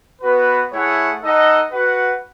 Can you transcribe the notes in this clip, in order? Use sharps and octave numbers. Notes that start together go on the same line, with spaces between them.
B3 F#4 B4
A3 E4 G#4 C#5 F#5
D#4 A4 D#5 F#5
F#4 B4 F#5